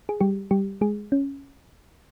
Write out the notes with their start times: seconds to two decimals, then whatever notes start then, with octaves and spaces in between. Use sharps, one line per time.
0.09 G#4
0.21 G3 G4
0.51 G3 G4
0.81 G#3 G#4
1.12 C#4